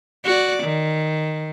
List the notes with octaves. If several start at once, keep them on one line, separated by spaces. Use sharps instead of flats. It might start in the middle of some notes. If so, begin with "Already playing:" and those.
F#4 D5
D#3